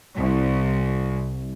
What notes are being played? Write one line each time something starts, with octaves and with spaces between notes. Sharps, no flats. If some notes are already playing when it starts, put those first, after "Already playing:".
C2